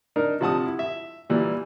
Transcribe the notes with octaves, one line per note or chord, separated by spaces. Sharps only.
D4 D#4 A#4
C3 F3 F#5 A5 D#6
E4
E5
A#2 E3 G3